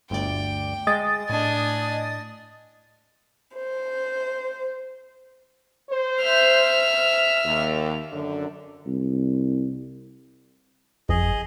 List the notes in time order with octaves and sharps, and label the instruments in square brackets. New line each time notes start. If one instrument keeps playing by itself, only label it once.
[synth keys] G1 D2 D5 [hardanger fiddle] G5
[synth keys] G#3 [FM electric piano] D#5 D#6 A6
[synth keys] A2 [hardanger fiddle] D4 G#5
[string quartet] C5
[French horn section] C5
[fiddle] E5 F6
[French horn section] D#2
F#2 D3
[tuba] C2
[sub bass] G1 [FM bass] F2 [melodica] G#4 D#5